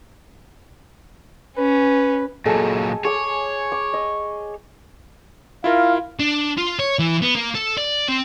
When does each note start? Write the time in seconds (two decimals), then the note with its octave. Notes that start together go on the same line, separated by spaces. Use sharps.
1.57 C#4 B4
2.45 A#2 F#3 G#4 A4 D#5
3.05 G#4 C#5 D6
3.72 D6
3.94 D#5
5.64 E4 F4 A#4 F5
6.20 D4
6.58 F4
6.79 C#5
6.99 E3
7.22 B3
7.35 A#3
7.55 A4
7.78 D5
8.09 C4